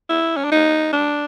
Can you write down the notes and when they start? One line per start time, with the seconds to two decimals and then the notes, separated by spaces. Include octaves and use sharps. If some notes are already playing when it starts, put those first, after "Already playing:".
0.10 E4
0.37 C#4
0.44 D4
0.52 D#4
0.93 D4